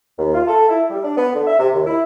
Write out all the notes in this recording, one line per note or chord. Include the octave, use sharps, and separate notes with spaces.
D#2
F4
A4
E4
G3
D4
B3
D3
E5
C3
D#2
E4